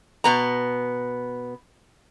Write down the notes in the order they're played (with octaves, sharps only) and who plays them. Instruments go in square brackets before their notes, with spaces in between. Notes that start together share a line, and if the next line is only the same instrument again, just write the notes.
[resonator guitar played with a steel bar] B2 B3 A#5